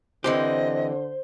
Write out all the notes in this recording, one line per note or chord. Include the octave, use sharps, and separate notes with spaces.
D3 E3 C4 G4 C5 D#5